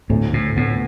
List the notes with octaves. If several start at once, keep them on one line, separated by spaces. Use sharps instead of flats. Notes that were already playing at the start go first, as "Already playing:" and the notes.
D2 A2
A2
A2 B3